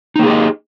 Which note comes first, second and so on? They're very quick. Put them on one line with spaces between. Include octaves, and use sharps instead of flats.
D#4 A#3 G#4 G4 D#5